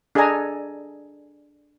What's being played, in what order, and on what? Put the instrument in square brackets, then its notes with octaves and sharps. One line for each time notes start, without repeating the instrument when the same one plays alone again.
[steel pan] D4 G#4 A4 D#5 G#5 A#5